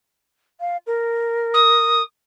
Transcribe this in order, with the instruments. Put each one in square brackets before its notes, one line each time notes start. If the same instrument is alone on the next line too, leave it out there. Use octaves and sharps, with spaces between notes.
[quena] F5
A#4
[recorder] D#6